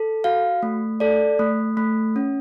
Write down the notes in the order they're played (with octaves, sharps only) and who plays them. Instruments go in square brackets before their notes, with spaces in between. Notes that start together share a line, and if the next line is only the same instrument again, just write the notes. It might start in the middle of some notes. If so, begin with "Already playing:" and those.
Already playing: [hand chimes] A4
F#4 F5
A3
A4 D5
A3
A3
C#4